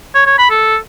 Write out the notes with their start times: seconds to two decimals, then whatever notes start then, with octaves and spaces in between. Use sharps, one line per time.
0.15 C#5
0.27 C#5
0.38 B5
0.50 A4